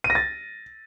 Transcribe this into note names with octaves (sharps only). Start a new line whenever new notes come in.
D#7
A#6
A6